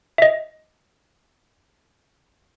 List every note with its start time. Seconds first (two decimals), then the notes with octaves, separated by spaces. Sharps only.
0.18 D#5 E5